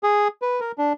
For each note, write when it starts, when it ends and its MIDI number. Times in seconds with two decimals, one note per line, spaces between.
0.03 0.28 68
0.42 0.60 71
0.60 0.72 70
0.78 0.93 62